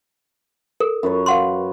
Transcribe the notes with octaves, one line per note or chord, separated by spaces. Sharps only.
A4 A#4
F#2 B4 C#5
F5 F#5 C6